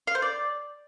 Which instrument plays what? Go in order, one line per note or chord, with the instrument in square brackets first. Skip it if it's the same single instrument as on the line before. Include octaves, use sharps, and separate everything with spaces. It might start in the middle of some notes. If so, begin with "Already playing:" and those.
[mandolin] F5
C5
D5